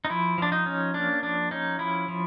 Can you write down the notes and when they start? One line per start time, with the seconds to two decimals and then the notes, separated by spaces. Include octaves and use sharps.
0.05 D#4
0.09 F3 E4
0.38 F3 D4
0.52 D#4
0.66 C#4
0.94 A#3 D4
1.23 F3 D4
1.51 C#4 D#4
1.79 F3 E4
2.08 F3